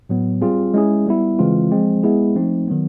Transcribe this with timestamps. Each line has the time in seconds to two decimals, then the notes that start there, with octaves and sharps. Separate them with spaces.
0.09 A2 F#3 B3
0.41 G3 C4 F4 G#4
0.74 G#3 C#4 E4 G#4
1.07 G3 B3 E4
1.39 C#3 E3 G#3 C4 F4
1.71 F3 G#3 C4
2.03 G#3 B3 E4 G#4
2.36 F3 A3 C4 D#4
2.68 D#3 F#3 B3